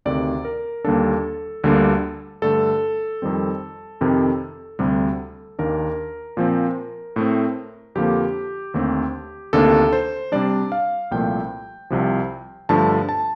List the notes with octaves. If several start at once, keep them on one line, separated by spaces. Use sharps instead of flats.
D2 C3 D#3 D5
A#4
D#2 D3 G3 A#3 D4 A4
D2 D3 G3 A#3 D4
G2 D3 A3 A4
F2 D#3 G3 C4
F2 C3 D#3
D2 C3 G3
D#2 D#3 A#3 D4 A#4
A#2 F3 C4
A2 A3 C4
F2 D3 F3 A#3 G4
D#2 D3 A3 C4
D2 C3 D#3 A#3 D4 A4
C5
C3 G3 D4 D5
F5
C2 A#2 F3 A3 G5
C2 C3 F3
G2 D3 F3 A3 A5
A5